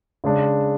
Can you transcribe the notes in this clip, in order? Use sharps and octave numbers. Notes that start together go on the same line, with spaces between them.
C#3 G#3 D4